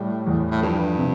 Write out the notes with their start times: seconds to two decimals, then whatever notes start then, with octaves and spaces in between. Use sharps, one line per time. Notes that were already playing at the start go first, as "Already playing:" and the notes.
Already playing: A2 G3
0.27 E2
0.51 A2
0.62 G2 F3
0.98 C3